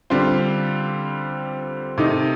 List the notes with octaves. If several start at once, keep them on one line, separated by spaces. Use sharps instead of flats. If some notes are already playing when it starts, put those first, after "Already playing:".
D3 G3 C4 F4
C3 D#3 A3 D#4